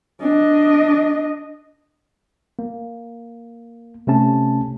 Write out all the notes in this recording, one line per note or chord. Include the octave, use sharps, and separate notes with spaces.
D4 D#5
A#3
C3 A3 C#4 A5